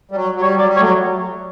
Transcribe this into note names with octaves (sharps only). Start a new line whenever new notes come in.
G3
F#3
F#3
G3 C#5
F#3 D5
G3
C#5
F#3 A3